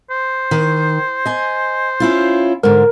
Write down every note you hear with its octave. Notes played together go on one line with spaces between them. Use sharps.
C5
D#3
D#5 G#5
C#4 E4 F4
G#2 D3 A#4